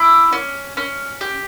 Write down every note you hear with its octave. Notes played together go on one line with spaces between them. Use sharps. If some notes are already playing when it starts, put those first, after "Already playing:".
Already playing: E4 D6
C#4
C#4
G4